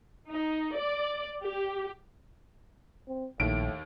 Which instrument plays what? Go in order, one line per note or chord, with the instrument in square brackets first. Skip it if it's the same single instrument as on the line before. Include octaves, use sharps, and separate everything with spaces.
[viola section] D#4
D5
G4
[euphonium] C4
[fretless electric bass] A#1 [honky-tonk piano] D#2 D7 [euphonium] A2